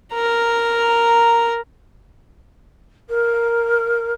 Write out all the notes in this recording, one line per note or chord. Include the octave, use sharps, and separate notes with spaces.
A#4 A#5
A#4